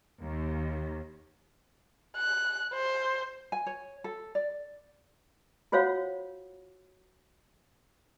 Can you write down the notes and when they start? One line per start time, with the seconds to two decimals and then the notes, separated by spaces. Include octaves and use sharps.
0.21 D#2
2.17 F#6
2.74 C5
3.52 G#5
3.66 C#5
4.04 A4
4.35 D5
5.72 F4 F#4 C5 C#5 F5 F#5